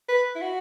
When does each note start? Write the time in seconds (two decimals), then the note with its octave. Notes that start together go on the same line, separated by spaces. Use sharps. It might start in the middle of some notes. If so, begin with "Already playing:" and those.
0.09 B4
0.35 E4
0.41 F#4